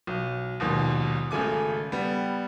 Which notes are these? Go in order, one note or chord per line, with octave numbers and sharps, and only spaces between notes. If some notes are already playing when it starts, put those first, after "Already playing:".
B1
A#1 D#2 G#2 B2
G#1 C#3 A3 G#5 D6
G3 B3